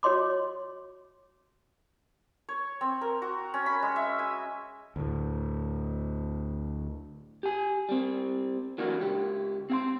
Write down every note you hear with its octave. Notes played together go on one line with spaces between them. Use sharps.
F#4 C#5 D#5 C6 D6
C#5
C4
A#4
F#4
C#4
B5
G#3
E5
G#5
D2 A2
G4 G#5
G3 C4
E3 F#3 A#3 C#4 D4 F#4
C#2 G4
C4 F5 C6